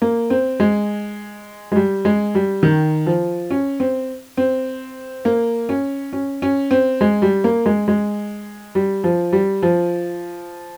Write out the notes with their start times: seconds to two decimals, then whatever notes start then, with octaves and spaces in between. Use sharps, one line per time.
0.02 A#3
0.30 C4
0.60 G#3
1.72 G#3
1.76 G3
2.05 G#3
2.35 G3
2.63 D#3
3.06 F3
3.51 C#4
3.80 C4
4.37 C4
5.25 A#3
5.69 C#4
6.13 C#4
6.42 C#4
6.71 C4
7.01 G#3
7.22 G3
7.44 A#3
7.66 G#3
7.88 G#3
8.75 G3
9.04 F3
9.33 G3
9.63 F3